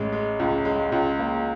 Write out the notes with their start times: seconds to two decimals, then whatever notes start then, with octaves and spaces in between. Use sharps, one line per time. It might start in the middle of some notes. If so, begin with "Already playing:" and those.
Already playing: A1 G#3
0.12 G#3
0.40 C#2
0.65 G#3
0.92 C#2
1.19 A#3